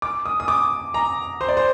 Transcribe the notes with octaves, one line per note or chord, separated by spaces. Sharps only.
D6
D#6
D#6
D6
A#5
C5
D5
C5